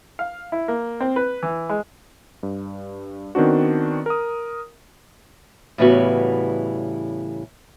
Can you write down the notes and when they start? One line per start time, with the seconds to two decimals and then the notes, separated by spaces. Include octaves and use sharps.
0.19 F5
0.52 E4
0.68 A#3
1.00 C4
1.16 B4
1.43 E3
1.69 G#3
2.43 G2
3.35 D#3 B3 C4 D4 F#4
4.06 A#4 D#6
5.78 A2 C#3 E3 G3 B3 F#4